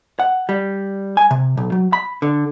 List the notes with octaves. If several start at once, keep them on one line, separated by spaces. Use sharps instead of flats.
F#5
G3
G#5
C3
B1
F#3
B5
D3